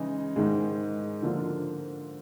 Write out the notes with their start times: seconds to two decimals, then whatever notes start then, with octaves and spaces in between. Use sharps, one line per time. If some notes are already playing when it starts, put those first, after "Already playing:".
Already playing: C#3 E3 G#3 D#4
0.36 G#2 D#3 G#3
1.22 D3 F3 A#3 D4 F4